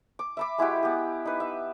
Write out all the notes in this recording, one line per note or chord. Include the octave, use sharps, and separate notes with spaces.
D6
E5 B5 D6
G#3 E4 F#4 G4
B3 G4
D#4 B4
E5